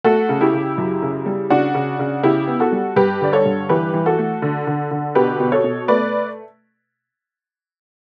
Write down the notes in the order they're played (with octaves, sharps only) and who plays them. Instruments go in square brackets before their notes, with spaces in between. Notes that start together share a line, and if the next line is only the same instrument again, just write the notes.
[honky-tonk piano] A3 F#4 A4
C#3
E4 G4
C#3
F#2
C#3
G3
C#3 D4 F#4
C#3
C#3
C#3 E4 G4
B3
F#4 A4
G3
G2 G4 B4
D3 D5
A4 C#5
G2
E3 G4 B4
E3
F#4 A4
A3
D3
D3
D3
B2 G4 B4
B2
A4 C#5
B2
A3 B4 D5